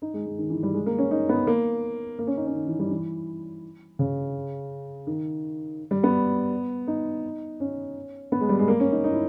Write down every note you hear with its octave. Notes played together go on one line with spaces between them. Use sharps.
D#4
G#3
G#3
D#3
E3
G3
G#3
A#3
C#4
D#4
B3
A#3
A#3
C#4
D#4
C#4
D#3
E3
G3
E3
C#3
D#3
G3
B3
D#4
C#4
B3
G#3
G3
G#3
A#3
C#4
D#4
D#4
E4